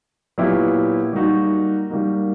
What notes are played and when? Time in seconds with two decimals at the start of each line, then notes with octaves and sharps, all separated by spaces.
0.38 A#2 F#3 B3 E4 G4
1.13 G3 A#3 D#4 F#4
1.90 G3 A#3 D#4 F#4